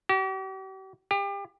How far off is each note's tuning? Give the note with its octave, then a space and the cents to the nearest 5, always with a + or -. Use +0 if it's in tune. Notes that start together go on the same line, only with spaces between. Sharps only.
G4 -45
G4 +30